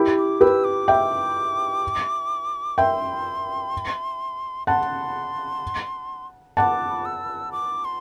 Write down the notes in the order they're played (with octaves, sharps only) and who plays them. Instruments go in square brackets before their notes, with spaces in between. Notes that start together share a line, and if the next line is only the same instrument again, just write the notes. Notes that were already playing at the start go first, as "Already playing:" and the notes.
Already playing: [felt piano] E4 G4
[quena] D6
[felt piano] G4 B4 [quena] E6
[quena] D6
[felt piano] E5 G5
[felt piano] E5 G5 [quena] C6
[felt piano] F#5 A5 [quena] C6
[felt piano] F#5 A5 [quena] D6
[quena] E6
D6
C6